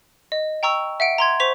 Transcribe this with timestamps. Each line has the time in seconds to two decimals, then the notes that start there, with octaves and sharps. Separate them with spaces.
0.32 D#5
0.63 G5 A#5 C#6 E6
1.00 E5 F#5 D7
1.18 A#5 C6 G#6
1.40 C5 C#6 B6 F7